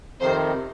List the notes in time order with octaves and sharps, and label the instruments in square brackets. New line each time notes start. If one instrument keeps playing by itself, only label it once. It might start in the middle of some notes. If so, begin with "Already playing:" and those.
[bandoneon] F2 C3 D#3 [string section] C5